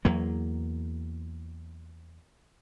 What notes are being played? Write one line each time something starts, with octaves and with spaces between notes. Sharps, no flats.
E2 F#3 A#3